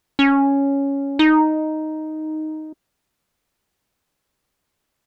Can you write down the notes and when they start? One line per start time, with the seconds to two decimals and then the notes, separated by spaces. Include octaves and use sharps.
0.19 C#4
1.19 D#4